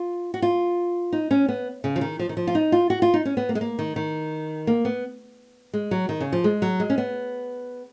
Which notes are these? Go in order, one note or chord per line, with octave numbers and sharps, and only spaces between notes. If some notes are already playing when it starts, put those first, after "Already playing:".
Already playing: F4
F#4
F4
D#4
C#4
B3
C#3
F3
D#3
F3
D#3
F3
F4
D#4
F4
F#4
F4
D#4
C#4
B3
A#3
G#3
A#3
D#3
D#3
A#3
B3
G#3
F#3
D#3
C#3
F3
G#3
F#3
G#3
C#4
B3